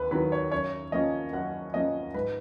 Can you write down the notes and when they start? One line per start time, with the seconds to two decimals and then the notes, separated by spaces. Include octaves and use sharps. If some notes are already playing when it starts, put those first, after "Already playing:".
Already playing: D#2 B4
0.11 D#3 F#3 B4
0.32 C#5
0.51 F#2 C#5
0.92 F3 A#3 C#4 D#5
1.33 F#2 F#5
1.74 F3 A#3 C#4 D#5
2.14 G#2 B4